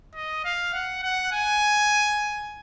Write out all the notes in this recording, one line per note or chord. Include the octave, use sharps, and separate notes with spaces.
D#5
F5
F#5
F#5
G#5